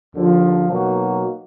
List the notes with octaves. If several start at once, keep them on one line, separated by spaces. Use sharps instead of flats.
D#2 D3 F3
B2 F#3 A#3 D#4 F#4